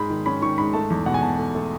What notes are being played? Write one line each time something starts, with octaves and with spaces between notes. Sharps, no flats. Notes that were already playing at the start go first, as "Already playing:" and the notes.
Already playing: G#2 G#3 B5
D#3
C#4 B5
D#3 C#6
G#2 B5
A3 A5
E2
B2 F#5
G#5
B2 A5
A3
A3